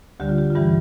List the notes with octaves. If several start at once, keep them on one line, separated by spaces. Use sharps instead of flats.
D2 D3 G3 G4
F4
G4
F4
G2 E3 G3 G4